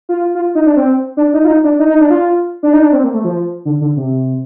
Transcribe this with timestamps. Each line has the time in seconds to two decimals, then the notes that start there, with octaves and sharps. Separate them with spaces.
0.09 F4
0.35 F4
0.55 D#4
0.66 D4
0.76 C4
1.17 D4
1.33 D#4
1.44 F4
1.48 D#4
1.64 D4
1.79 D#4
1.90 D#4
2.00 D4
2.10 F4
2.63 D4
2.73 D#4
2.82 D4
2.93 C4
3.04 A#3
3.14 A3
3.24 F3
3.65 D3
3.81 D3
3.96 C3